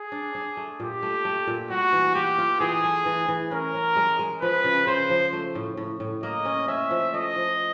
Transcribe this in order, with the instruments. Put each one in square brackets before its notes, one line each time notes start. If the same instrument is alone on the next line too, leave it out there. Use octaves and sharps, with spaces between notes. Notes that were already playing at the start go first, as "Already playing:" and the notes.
Already playing: [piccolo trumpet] G#4
[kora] D4
D4
A3
[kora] A#2 [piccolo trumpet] G4
[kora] A3
A3
A#2
[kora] G3 [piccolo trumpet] F#4
[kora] E3
[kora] F4 [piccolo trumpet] G4
[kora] F4
[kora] E3 [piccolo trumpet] G#4
[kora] A3
E3
E3
[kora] C#4 [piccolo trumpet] A#4
[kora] C#4
G#3
G#3
[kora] F3 [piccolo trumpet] B4
[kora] C#3
[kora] C#3 [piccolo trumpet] C5
[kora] F3
A3
A2
A2
A2
[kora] A#3 [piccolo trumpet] D#5
[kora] C#4
[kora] C#4 [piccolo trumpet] E5
[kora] F3
[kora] A3 [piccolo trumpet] D#5
[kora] F3